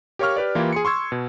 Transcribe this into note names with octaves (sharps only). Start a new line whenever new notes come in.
G4 A#4 C#5 F5 C#6 F6
G4 B4 D5
E3 A#3 E4 F4 G4
G#4 C6 C#7
C6 C#6 E6 G#6
B2